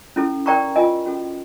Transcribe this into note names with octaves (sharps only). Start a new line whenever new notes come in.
C#4 E4 A4
A#4 D5 G5 A#5 C#6
F4 A#4 D#5 G#5
C#4 F#4 A4